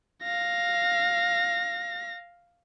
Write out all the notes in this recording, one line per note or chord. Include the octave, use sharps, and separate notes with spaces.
F5 A#6